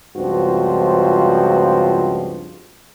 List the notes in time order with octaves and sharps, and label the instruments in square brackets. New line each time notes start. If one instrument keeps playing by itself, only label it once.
[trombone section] C#2 G2 F3 C4 F#4